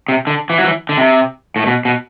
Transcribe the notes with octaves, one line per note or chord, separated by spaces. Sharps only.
C3
D3
E3
F#3
E3
D3
C3
A2
B2
B2